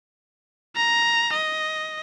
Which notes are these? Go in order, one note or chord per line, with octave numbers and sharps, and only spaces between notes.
A#5
D#5